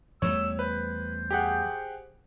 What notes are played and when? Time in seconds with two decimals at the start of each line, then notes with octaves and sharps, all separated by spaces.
0.22 E2 G3 A3 C#5 E6
0.59 B4 C5
1.31 G4 G#4 F#5